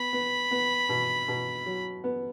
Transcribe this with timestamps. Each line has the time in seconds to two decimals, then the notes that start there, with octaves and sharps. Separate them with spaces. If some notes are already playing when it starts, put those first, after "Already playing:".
Already playing: B3 B5
0.13 B3
0.51 B3
0.89 B2
1.28 B2
1.66 F#3
2.04 B3